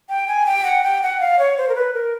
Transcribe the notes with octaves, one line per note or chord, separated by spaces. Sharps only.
G5
G#5
G5
F#5
G5
F#5
F5
C#5
C5
A#4
B4
A#4